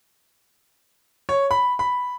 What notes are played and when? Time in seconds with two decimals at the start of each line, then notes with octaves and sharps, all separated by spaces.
1.29 C#5
1.51 B5
1.79 B5